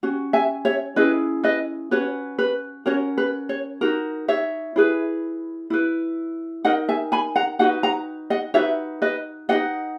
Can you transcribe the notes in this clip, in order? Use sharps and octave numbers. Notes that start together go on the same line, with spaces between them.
C#4 F#4
E5 G#5
C#5 E5
C#4 E4 G#4 B4 D#5
B4 D#5
C#4 F#4 B4 C#5
B4
C#4 F#4 A#4 C#5
B4
C#5
D#4 F#4 A#4
C#5 E5
E4 G#4 B4
E4 B4
D#4 A#4 D#5 F#5
E5 G#5
G#5 B5
F#5 A#5
D#4 F#4 B4 D#5 F#5
F#5 A#5
D#5 F#5
D#4 F#4 B4 C#5 E5
B4 D#5
D#4 G#4 B4 D#5 F#5